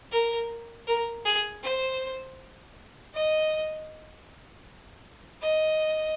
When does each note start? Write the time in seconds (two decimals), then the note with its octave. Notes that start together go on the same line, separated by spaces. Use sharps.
0.12 A#4
0.87 A#4
1.25 G#4
1.63 C5
3.14 D#5
5.42 D#5